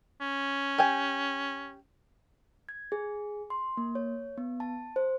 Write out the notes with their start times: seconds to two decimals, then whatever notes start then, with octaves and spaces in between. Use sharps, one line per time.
0.21 C#4
0.78 G4 G#5
2.69 G#6
2.92 G#4
3.50 C6
3.77 A#3
3.95 C#5
4.37 B3
4.60 A5
4.96 C5